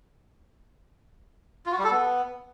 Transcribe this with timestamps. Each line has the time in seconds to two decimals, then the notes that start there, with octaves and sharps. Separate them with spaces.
1.66 F4
1.72 F#4
1.78 G3
1.84 A4
1.91 B3